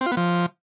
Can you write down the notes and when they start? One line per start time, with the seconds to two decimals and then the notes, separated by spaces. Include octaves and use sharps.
0.01 C4
0.06 F4
0.12 B3
0.17 F3